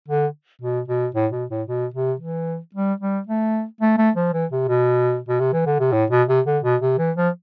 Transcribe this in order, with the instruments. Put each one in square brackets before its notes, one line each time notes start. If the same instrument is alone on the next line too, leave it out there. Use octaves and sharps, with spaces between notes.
[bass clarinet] D3
B2
B2
A2
B2
A2
B2
C3
E3
G3
G3
A3
A3
A3
F3
E3
C3
B2
B2
C3
E3
D3
C3
A2
B2
C3
D3
B2
C3
E3
F3